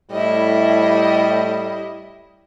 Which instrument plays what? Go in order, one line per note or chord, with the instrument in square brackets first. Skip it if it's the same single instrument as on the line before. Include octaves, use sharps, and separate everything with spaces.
[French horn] A2 [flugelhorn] G3 [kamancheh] E4 D#5